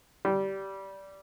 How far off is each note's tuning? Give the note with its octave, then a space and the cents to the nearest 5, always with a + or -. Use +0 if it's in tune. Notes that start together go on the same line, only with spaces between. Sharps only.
G3 -15